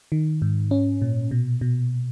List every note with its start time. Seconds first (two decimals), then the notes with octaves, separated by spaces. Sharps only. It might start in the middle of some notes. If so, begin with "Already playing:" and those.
0.12 D#3
0.42 G#2
0.71 C#4
1.02 A#2
1.31 B2
1.61 B2